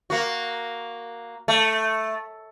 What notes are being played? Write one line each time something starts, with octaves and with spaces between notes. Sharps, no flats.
A#3 F#4
A3